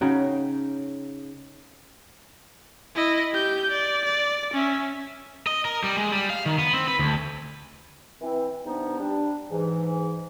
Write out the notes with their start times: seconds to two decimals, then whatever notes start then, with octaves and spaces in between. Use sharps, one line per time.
0.01 C#3 D#4 F#4 G5
2.95 E4 D#5
3.32 G4 G6
3.71 D5
4.05 D5
4.54 C#4 E5
5.47 D#5
5.65 A#4
5.84 G3
5.97 G#3
6.12 G3
6.30 F5
6.46 D#3
6.58 B3
6.73 C4
6.88 B4
6.99 D2
8.21 E3 C4
8.65 G2 C3 B3 D4 D#4
8.99 G3 D4
9.51 G#2 E3